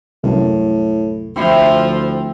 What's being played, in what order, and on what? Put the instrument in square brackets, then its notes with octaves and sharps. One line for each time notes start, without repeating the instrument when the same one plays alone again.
[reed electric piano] C2 F#2 [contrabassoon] A2
[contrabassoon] D2 [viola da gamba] F3 [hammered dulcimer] C4 E4